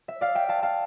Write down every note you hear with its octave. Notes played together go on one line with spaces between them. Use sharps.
E5
D5 F5
E5 G5
F5 A5
F5 A5